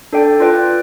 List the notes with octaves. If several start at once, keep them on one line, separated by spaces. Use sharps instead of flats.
D4 A4 D5 G5
F4 B4 D5 G5